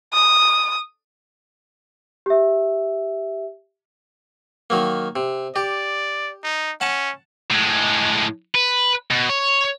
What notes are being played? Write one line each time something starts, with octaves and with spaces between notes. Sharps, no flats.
D#6
G4 E5
D#3 F#3 A#3
C3
G4 D5
D#4
C#4 F#5 A5
A2 G#3
B4
B2
C#5